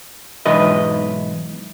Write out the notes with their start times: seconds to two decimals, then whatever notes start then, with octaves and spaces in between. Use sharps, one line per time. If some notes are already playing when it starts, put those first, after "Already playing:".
0.46 B1 G#2 E3 B4 D#5